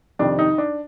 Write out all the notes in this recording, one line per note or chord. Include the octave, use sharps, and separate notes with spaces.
F2 C3 D#3 D4
D#4
D4